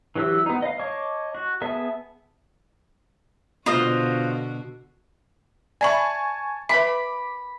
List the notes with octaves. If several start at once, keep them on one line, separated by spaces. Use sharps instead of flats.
E3 F#3 F#4 G4 E6
B3 D#4
D#5 F5
C#5 D#5 A5 D6
F#4
B3 G#4 E5 A5
B2 D3 F4 F#4 C5 D#5
D5 E5 G#5 A5 B5 C#6
B4 E5 B5 D6